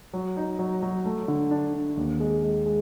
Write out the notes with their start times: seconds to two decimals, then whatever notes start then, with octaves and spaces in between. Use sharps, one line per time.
0.13 F#3
0.37 D#4
0.59 F#3
0.83 F#3
1.06 A3
1.28 D3
1.51 D4
1.74 D4
1.97 D#2
2.20 G#3
2.43 G#3
2.66 G#3